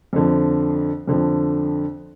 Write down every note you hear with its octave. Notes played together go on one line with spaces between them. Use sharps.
F2 D3 F3
F2 D3 F3